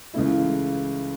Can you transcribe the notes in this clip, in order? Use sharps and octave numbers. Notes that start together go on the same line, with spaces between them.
C#2 C#3 E3 A3 E4